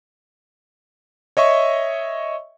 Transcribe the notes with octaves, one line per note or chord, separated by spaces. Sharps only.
C#5 D#5 E5 C#6